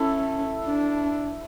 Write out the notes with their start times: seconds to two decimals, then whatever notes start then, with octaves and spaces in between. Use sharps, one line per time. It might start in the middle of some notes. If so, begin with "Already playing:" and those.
Already playing: C#4 E4 A4 E5
0.65 D4